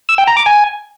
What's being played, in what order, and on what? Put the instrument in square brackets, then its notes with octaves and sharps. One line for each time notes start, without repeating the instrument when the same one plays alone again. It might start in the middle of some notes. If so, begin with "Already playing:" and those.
[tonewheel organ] E6
G5
A#5
D6
G#5